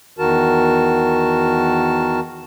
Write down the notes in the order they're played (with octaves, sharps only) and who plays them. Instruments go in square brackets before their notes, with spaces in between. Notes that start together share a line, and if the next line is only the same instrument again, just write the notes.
[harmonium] E2 D#3 F#4 A#4 A5